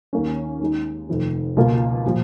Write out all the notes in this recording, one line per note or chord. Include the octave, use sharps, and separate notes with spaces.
D#2 D#3 A#3 C#4
D#2 D#3 G#3 D#4
F1 F2 D#3
C#2 B2 A#3 F4
A#2 F3